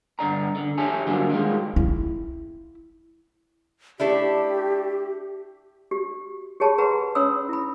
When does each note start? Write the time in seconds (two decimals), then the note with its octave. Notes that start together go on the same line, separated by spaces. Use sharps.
0.19 G2 D3 D5 A#5
0.56 D3
0.78 G4 A4 C#5 E5 G#5 A5
1.07 G2 D3 F3 F#3 A#3 D4
1.29 D#3 F3 G3 G#3 F4
1.76 E4
4.00 A3 D4 E4 G4
5.91 F#4 G4
6.60 G4 G#4 C#5 A5 B5
6.78 G#4 B4 F#5 A#5 C6
7.15 C#4 C#5 B5 D#6 E6
7.49 E4 B5